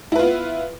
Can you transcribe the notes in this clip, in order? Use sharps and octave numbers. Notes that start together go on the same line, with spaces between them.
B3 E4 F4 B4